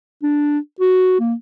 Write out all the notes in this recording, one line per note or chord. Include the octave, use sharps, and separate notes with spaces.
D4
F#4
A#3